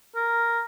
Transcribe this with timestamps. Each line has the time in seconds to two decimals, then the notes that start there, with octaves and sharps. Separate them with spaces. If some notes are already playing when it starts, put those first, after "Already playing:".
0.15 A#4